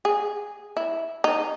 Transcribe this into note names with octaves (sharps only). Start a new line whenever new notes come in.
G#4
E4
D#4